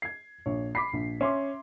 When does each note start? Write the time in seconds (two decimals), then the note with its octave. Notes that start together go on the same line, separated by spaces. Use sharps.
0.02 G#6 C7
0.46 A#1 C#5
0.75 B5 D6 B6 C7
0.93 A#1
1.21 C#4 E5 C6 D6